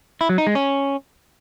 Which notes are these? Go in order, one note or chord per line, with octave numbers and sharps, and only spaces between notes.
E4
F#3
D#4
G#3
C#4